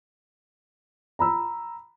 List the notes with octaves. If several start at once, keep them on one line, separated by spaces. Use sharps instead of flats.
A#5 B5 E6